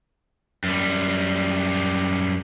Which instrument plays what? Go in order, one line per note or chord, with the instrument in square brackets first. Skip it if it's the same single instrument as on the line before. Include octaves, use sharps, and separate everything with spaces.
[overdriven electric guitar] F#2 G3